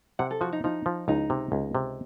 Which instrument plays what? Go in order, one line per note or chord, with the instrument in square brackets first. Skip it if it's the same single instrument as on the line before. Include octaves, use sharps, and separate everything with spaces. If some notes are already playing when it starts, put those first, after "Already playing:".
[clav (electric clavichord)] C3 [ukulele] F#5
[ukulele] A4
[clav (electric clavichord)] F3 [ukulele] F#4
[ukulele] D#4
[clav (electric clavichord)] F3 [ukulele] D#4
[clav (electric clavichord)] F3
[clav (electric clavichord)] C#2 [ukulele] D#4
[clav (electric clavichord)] C3
C#2
C3